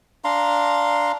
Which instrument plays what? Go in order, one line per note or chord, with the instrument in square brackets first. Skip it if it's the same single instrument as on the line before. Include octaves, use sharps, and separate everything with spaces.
[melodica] D4 F5 A#5 C6